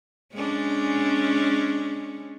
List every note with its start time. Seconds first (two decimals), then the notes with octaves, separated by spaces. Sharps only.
0.33 G#3 C#4 D4